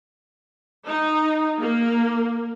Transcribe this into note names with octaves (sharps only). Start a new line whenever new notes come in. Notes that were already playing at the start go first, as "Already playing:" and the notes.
D#4
A#3